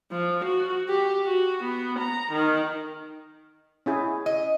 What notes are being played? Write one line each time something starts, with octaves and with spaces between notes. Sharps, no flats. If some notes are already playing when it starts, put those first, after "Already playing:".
F3
F#4
G4
F#4
B3
A#5
D#3
C#4 E4 G#4
D#5